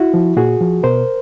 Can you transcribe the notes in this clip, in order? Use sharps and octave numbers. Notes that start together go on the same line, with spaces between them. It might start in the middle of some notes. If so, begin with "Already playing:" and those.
Already playing: E4 F#4
F3
A#2 F#4 G#4
F3
B2 A#4 C5